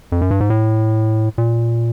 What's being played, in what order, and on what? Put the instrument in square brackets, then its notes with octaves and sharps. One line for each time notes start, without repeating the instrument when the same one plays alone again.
[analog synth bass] F2
F#2
G2
G#2
A2
A#2